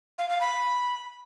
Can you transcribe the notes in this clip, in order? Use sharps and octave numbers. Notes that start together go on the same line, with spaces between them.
F5
F5
B5